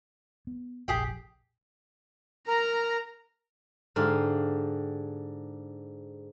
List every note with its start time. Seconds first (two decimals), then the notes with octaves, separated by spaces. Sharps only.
0.47 B3
0.88 F1 A#1 G4 G#4 G5
2.48 A#4 A#5
3.96 G#2 D3 G4 F5